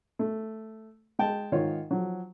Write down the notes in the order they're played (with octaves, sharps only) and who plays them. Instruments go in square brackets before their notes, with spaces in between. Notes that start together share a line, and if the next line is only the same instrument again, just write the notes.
[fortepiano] A3
G#3 G5 A5
G#2 D#3 F4 C#5
F3 F#3